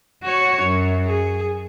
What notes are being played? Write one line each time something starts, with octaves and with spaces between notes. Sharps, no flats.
F#4 C#5
F#2
G#4